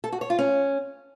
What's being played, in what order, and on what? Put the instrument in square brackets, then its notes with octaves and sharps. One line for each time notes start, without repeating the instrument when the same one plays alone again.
[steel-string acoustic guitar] A4
F#4
C#5
F4
C#4